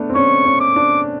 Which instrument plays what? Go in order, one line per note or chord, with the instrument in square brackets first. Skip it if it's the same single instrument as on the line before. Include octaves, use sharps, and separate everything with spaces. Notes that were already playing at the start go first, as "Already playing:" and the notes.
Already playing: [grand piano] A3 B3 D4
C4
[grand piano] C#4 [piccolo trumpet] C#6
[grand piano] C#4
[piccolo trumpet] D6
[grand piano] D4